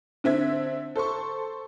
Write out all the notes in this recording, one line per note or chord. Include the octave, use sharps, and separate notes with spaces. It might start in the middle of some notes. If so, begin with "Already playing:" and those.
D3 C4 E5 G#6
A4 C5 C6 C#6